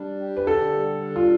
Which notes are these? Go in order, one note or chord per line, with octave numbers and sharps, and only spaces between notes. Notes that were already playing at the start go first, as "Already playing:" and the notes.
Already playing: G3 D4
G4
B4
D3 A4
G3
D4
F4